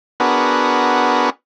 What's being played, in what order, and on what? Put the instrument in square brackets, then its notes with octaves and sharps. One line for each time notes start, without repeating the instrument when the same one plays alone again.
[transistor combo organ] B3 D4 F#4 G#4 A#4 B4